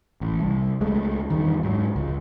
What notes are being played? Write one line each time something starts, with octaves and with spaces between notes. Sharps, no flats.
A1
C2
C#2 G#3 A3
E2 G2 D#3
G#2 F#3
C#2